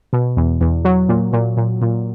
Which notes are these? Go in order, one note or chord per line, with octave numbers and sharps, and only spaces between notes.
B2
E2
E2
F#3
A#2
A#2
A#2
A#2